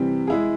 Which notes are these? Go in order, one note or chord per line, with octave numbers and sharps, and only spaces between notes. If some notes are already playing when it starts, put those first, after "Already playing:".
Already playing: C3 E3 G3 C4
G#3 E4 G#4